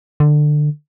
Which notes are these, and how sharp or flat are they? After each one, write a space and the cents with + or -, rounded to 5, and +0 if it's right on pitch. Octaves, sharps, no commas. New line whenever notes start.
D3 +20